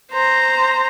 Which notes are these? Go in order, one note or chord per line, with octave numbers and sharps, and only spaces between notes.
C5 A#5